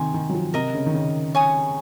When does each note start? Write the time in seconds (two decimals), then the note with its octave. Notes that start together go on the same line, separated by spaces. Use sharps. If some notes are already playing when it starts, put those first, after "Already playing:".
Already playing: C3 D#3 G#5 C6 D#6
0.14 D#3
0.30 F#3
0.35 F3
0.54 C3 A#4 D#5 A#5
0.75 C#3
0.86 D#3
0.94 C#3
1.35 C#5 G#5 D#6